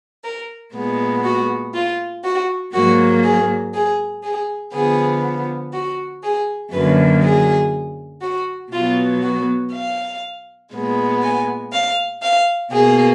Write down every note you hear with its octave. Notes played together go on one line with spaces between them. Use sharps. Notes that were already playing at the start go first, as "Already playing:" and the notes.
A#4
A#2 G#3 B3
F#4
F4
F#4
G#2 F#3 A#3 F#4
G#4
G#4
G#4
D3 F3 B3 G#4
F#4
G#4
F#2 D3 F#3 A#3 B4
G#4
F#4
B2 F#3 B3 F4
F#4
F5
A#2 G#3 B3
G#5
F5
F5
B2 A#3 G#4